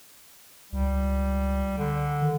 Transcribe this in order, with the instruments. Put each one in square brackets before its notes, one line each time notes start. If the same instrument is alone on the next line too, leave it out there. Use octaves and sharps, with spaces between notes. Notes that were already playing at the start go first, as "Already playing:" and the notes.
[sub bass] C#2 [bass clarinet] G3
[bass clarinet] D3
[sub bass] D#3